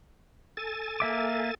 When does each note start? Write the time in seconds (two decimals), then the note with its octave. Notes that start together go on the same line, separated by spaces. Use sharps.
0.57 A4 G#5 A6
1.00 A#3 E5 D6